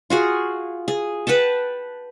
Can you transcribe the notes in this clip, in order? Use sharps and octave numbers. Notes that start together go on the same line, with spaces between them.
F4 F#4 G#4
G#4
B4 F#5 G5 A5